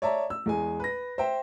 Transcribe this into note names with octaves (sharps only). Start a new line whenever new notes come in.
C#5 D5 E5 A5 A#5
E6
E2 G#3 G#5
B4 A#6
C5 E5 G5